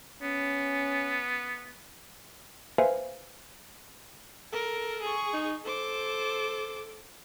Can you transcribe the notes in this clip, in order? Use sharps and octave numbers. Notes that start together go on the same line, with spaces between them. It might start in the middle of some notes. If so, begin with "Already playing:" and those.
B3 C#4
B4 C5 E5 F5 G#5
A4 A#4
G#4 C#6
D#4
A4 C5 D6